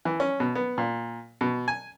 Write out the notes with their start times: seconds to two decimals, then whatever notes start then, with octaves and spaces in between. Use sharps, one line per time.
0.05 E3
0.20 C#4
0.40 B2
0.55 B3
0.78 A#2
1.41 B2
1.68 G#5